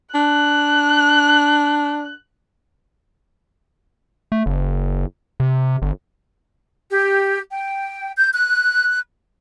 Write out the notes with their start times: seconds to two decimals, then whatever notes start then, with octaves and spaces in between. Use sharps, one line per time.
0.15 D4 F#6
4.32 A3
4.46 F#1
5.40 C3
5.82 G1
6.91 G4
7.50 G5
8.16 G6
8.32 F#6